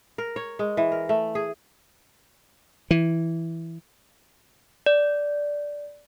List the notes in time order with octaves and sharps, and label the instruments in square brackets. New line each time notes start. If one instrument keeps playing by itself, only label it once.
[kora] A#4
C#5
G#3
E3
A#4
A3
G#4
[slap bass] E3
[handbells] D5